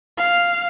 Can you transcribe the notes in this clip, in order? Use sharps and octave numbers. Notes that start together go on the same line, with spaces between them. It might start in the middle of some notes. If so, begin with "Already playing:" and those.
F5